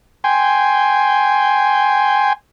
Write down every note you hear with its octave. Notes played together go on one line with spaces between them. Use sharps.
G5 G#5 C6